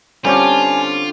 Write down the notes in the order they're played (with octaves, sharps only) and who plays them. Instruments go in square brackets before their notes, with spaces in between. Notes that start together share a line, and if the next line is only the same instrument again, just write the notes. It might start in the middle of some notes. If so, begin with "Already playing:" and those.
[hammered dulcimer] D3 G4 [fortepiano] G3 C4 C#4 [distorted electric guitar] F4 [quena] G#5